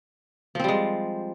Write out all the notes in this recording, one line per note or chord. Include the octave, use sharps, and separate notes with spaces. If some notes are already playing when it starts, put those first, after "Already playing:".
F3 G3 G#3 C4